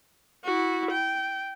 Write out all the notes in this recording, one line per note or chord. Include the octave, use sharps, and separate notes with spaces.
E4 F#4
G5